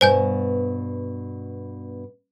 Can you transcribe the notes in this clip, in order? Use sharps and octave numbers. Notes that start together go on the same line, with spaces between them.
G2 B2 C5 G#5 G6